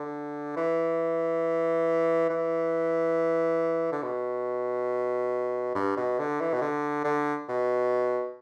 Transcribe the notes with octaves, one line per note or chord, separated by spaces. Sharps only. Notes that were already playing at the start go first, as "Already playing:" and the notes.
Already playing: D3
E3
E3
D3
B2
G2
B2
D3
E3
B2
D3
D3
B2